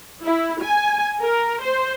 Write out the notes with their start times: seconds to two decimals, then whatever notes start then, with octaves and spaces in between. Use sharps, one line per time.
0.24 E4
0.63 G#5
1.21 A#4
1.63 C5